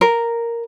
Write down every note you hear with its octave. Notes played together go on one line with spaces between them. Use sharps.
A#4